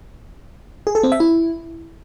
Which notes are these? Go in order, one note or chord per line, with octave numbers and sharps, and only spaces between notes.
G#4
A4
C4
E5
E4